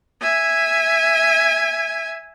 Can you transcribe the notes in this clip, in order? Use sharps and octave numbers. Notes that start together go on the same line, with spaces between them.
E5 G#5